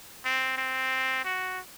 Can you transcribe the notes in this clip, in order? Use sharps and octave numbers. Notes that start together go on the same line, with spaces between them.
C4
C4
F#4